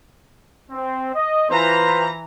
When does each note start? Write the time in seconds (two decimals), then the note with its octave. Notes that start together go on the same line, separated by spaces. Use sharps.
0.70 C4
1.14 D#5
1.49 E3 F4 B4 C5 A#5